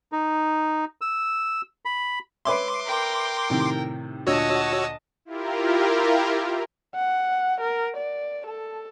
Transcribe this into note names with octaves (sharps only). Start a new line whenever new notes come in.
D#4
E6
B5
B4 C#5 E5 C6 D6
A#4 G5
A2 C3 D#3
D2 A#2 F#4 C#5 D#5 A5 E6
E4 F4 G4 A#4
F#5
A#4
D5
A4